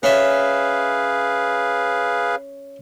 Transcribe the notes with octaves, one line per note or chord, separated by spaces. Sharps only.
C#4 G#4 B4 E5 F5